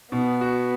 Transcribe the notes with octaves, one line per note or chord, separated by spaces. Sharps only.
B2 B3
F#4